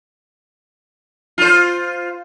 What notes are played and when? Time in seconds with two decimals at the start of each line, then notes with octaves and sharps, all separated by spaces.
1.38 F4 C5